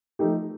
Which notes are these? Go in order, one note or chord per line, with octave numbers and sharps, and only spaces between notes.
F3 A3 D#4 G4